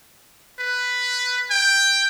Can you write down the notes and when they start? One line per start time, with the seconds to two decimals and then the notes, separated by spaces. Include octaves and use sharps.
0.59 B4
1.51 G5